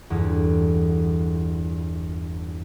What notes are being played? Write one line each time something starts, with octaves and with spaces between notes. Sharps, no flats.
G1 E2